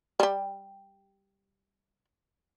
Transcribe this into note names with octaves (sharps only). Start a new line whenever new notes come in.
G3 G4